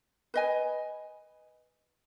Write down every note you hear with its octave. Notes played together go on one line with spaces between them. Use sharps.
B4 D#5 G#5